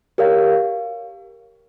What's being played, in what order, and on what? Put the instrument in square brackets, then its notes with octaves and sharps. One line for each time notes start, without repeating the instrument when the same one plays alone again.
[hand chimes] G4 A#4 C#5 F5